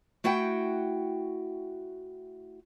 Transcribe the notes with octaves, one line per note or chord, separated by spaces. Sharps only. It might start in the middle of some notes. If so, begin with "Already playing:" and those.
A3 E4 F#4 F#5 G5